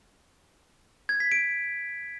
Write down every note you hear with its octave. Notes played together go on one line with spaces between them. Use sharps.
G#6
B6
D7